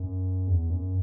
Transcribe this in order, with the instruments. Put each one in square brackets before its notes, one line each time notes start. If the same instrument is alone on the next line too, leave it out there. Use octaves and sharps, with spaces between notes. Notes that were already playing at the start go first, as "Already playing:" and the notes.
Already playing: [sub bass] F#2
E2
F#2